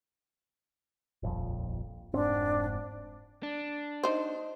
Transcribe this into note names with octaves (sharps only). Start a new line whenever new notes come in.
D#1 A#1 F2
F1 G#2 C4 D4
D4
D#4 C5